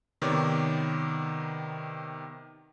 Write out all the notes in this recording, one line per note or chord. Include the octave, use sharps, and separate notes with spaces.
C3 D#3 B3 C#5 D5 D6